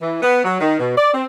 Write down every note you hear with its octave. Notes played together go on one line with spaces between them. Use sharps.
E3
B3
F#3
D#3
B2
D5
C4